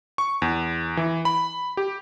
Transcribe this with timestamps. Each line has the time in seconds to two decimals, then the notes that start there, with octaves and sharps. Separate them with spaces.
0.18 C#6
0.42 E2
0.97 E3
1.25 B5
1.77 G4